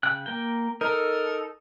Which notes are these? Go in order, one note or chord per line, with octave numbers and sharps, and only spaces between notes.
C#3 G5 F#6
A#3 A#4 G5
D#4 A4 A#4